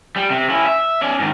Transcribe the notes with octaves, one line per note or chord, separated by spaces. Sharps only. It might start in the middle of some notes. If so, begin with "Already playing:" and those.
G3
C3
C#4 E4
E5
C#4 D5
G#2 D#3